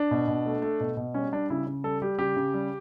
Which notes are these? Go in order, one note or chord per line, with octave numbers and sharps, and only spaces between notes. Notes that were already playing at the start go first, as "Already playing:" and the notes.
Already playing: D4
B2
B2
A3
A3
B2
B2
G3 C#4
G3 D4
C#3 E4
C#3
G3 A4
G3 G4
C#3 G4
C#3
G3